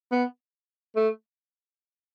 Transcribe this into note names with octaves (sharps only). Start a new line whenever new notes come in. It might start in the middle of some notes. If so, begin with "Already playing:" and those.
B3
A3